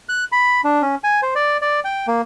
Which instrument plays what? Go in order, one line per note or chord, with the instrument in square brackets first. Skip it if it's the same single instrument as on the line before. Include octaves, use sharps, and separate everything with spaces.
[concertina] F#6
B5
D4
C#4
G#5
C5
D5
D5
G5
A#3